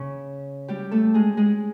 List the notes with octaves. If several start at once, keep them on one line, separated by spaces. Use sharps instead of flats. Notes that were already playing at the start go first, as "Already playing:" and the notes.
Already playing: C#3 C#4
G3 G4
A3 A4
G#3 G#4
G#3 G#4